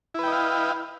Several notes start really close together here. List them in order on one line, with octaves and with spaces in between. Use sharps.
E4 B4 G5 D#5 F5